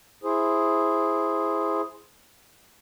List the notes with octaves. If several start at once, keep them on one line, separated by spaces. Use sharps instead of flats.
E4 G#4 C5